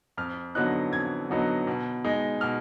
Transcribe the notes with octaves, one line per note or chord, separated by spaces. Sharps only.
F2 F6
D3 F#3 B3 D#4 F#6
F2 G#6
D3 F#3 B3 D#4
B2
G#3 D#4
B2 F6